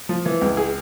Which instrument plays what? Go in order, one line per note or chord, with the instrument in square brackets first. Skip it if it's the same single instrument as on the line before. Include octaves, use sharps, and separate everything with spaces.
[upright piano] F3
E3
C#2
G#4